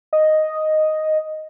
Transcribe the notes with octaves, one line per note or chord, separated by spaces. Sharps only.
D#5